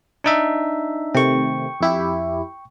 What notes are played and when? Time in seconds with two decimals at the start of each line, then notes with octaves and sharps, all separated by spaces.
0.24 D4 D#4 E5
1.15 C3 D#3 A3 G5 C#6
1.81 F2 E4 G4